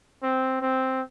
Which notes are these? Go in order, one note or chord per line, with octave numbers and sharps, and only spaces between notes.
C4
C4